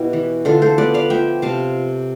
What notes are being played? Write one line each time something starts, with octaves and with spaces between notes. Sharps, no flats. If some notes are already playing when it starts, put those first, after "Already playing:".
Already playing: B2 E4 G4
E3
D3 F4 A4
A4 C5
B3 B4 D5
D5 F5
F3 E5 G5
C3 F5 A5